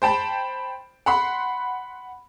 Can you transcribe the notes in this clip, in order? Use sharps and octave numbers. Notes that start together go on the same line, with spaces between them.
C5 G5 A5 B5
F#5 B5 C6